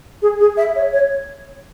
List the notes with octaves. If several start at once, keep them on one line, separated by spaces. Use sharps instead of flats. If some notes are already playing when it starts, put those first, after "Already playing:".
G#4
G#4
E5
C#5
C#5